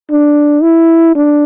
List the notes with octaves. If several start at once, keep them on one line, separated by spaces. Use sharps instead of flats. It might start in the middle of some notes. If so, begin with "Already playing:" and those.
D4
E4
D4